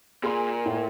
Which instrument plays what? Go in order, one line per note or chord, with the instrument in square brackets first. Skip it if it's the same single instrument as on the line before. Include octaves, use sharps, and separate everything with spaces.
[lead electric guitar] A#2 [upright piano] G#4 C6
[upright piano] A2